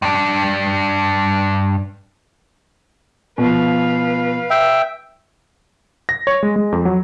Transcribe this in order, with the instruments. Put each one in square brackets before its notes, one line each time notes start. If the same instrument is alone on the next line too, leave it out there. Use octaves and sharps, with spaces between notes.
[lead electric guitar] G2 D4
[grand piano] B2 F3 [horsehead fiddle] B4 F5
[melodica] E5 G5
[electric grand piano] A#6
C#5
G#3
G#3
F2
F#3